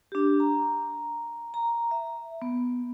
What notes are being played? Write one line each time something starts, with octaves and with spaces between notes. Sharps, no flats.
D4 G4
A#5
A#5
E5
B3